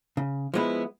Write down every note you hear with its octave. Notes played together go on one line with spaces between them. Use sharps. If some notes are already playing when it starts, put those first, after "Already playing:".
C#3
F3 G#3 B3 E4